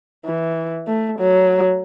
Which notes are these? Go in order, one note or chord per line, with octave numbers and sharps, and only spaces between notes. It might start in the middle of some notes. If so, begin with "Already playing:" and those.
E3
A3
F#3